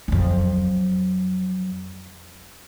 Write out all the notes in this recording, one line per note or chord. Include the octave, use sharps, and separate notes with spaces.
F2 F#3